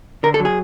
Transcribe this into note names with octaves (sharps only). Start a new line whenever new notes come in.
D3 A#4
A4
F#3
G#4